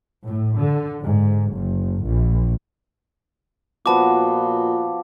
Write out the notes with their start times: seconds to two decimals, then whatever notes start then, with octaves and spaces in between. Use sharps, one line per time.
0.24 A2
0.58 D3
1.02 G#2
1.52 F#1
2.04 A#1
3.86 A#2 F3 B3 F#4 A5 D6